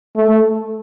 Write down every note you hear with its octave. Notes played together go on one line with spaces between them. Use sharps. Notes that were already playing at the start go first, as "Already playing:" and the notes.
A3